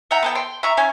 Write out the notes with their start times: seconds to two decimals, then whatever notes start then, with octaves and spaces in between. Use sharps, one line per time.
0.11 E5 F#5 G5 A#5
0.23 B3 A4 G5
0.35 G5 C6
0.63 E5 A#5 C#6
0.77 C#4 F5 G#5